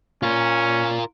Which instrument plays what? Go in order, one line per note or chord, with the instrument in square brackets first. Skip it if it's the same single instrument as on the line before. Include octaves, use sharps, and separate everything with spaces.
[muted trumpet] C#4 [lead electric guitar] F4 A#4